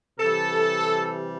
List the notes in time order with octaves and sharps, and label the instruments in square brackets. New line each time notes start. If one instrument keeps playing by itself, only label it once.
[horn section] C3 E3 G3 A4